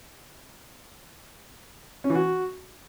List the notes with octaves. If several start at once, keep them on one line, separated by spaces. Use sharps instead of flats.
C#4
E3
F#4